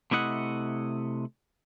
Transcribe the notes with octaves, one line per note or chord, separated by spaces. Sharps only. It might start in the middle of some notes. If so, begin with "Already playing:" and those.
C3 A3 E4 D#5 F#5